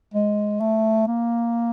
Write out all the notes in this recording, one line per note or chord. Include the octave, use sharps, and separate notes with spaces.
G#3
A3
A#3